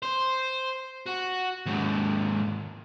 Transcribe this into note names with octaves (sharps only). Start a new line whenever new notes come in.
C5
F#4
D#2 G#2